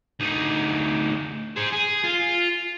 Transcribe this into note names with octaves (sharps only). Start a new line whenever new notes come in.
D2 D#4
G#4 C5
G#4
F4